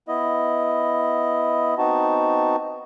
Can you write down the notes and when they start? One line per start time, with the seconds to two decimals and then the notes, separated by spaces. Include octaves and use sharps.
0.08 B3 E4 D#5
1.78 B3 C4 D#4 F#4 A5